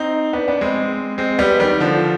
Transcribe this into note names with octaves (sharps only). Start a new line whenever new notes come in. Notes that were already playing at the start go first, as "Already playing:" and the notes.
Already playing: C4 D#4
B3 D4
B3 D4
G#3 C4
G#3 C4
G3 B3
D#3 G3
D3 F3